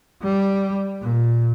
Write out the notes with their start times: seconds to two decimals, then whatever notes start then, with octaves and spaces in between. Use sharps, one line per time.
0.23 G3
1.02 A#2